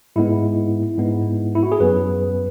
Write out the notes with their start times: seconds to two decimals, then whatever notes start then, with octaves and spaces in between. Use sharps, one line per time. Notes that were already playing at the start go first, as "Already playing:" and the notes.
0.16 G#2 G#3 B3 E4
0.98 G#2 G#3 B3
1.55 E4
1.63 F#4
1.72 G#4
1.80 F#2 F#3 B3 B4